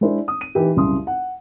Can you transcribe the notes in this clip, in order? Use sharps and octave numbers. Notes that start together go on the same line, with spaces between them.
G#3 D4 E4 C5
D#6
D#7
E3 D#4 G4
C2 F#2 C#3 C6 D#6
F#5